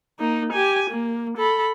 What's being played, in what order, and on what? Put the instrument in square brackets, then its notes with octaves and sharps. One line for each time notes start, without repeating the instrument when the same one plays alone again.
[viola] A#3 D#4
G4 G#5
A#3
A4 B5